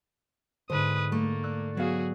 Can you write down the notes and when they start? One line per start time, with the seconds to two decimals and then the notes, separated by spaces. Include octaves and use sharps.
0.70 G#2 D3 B4 C5 D#6
1.12 A3 A#3
1.43 D5 E6 F#6
1.77 F#3 B3 F#4 G#4 F5